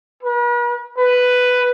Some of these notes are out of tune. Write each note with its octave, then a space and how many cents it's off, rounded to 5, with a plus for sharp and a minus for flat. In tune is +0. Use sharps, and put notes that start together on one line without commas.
B4 -45
B4 +5